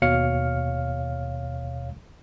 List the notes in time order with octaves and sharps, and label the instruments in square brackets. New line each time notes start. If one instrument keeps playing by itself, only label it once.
[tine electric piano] D#2 B2 C#5 F5 F6 C#7